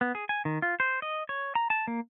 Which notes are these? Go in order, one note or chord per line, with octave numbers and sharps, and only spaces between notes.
B3
G#4
G#5
D#3
F4
C5
D#5
C#5
A#5
A5
A#3